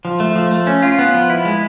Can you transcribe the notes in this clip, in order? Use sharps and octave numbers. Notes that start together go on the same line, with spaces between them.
F3
A3
F3
A3
C#4
F4
B3
F3
E4
G#3